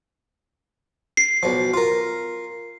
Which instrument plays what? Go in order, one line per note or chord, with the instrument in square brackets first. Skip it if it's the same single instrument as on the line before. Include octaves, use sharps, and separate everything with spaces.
[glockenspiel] C7
[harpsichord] B1 F3
F4 A#4